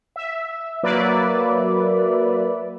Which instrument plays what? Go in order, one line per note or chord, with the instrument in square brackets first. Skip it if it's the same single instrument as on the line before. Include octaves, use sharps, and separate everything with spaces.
[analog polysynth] E5
F#3 A#3 B4 D5 E5